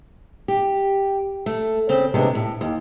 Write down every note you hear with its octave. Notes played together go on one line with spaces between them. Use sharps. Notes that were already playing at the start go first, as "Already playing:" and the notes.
G4
A3
C#3 C4
A2 C3 D#3 G#3 B3 D4
A2
D#2